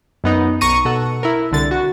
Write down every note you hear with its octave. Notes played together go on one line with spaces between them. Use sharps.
F#2 B3 D#4
B1 A#5 C#6 A#6 D#7
B2 A4 F#5
E4 A#4
C2 D3 A6
F#4